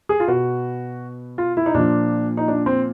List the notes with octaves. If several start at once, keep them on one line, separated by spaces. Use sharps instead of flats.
G#4
F4
B2 F#4
F4
E4
D#4
A#2 F3 D4
D#4
D4
C4